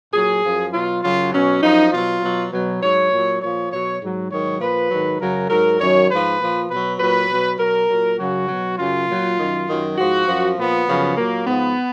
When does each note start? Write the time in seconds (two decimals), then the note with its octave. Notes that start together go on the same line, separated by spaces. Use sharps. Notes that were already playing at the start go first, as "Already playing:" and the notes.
0.13 A#2 F#3 G#4
0.44 F#2 F3
0.73 B2 F#3 F4
1.03 F#2 C#3 F#3 F4
1.32 B2 F#3 C#4
1.63 F#2 F3 D#4
1.92 B2 F#3 F4
2.22 B2 F#3
2.53 B2 F#3
2.83 G#2 F#3 C#5
3.12 A#2 F#3
3.41 A#2 F3 C#5
3.71 B2 F#3 C#5
4.02 G#2 F#3
4.31 G#2 D#3 F#3 C#5
4.60 A#2 F3 B4
4.90 G#2 D#3 F#3
5.20 F#2 C#3 F#3 A#4
5.50 G#2 F#3 A#4
5.80 F#2 D#3 F#3 C#5
6.10 G#2 F3 B4
6.40 A#2 F3
6.70 B2 F#3 B4
6.99 A#2 F#3 B4
7.29 B2 F#3
7.59 B2 F#3 A#4
7.89 A#2 F#3
8.18 F#2 C#3 F#3 F#4
8.48 B2 F#3
8.78 F#2 C#3 F#3 F4
9.08 A#2 F#3
9.39 F#2 D#3 F#3
9.68 F#2 D#3 F#3
9.98 G#2 F3 F#4
10.27 F#2 F3
10.58 A#2 F3 B3
10.88 F#2 C#3 F3
11.17 A#2 F#3 A#3
11.46 G#2 F3 B3